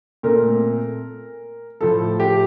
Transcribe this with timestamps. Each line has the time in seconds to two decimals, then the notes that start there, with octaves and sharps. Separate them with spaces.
0.23 A#2 A3 C4 A#4
1.81 A2 F3 A3 A4
2.20 G4